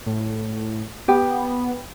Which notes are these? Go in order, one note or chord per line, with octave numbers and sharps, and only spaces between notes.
A2
B3 G4 G5